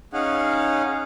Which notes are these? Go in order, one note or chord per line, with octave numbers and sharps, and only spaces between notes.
C#4 D#4 G#4 F5 F#5